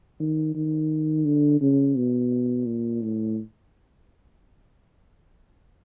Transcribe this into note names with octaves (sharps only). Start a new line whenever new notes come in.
D#3
D#3
D3
C#3
B2
A#2
A2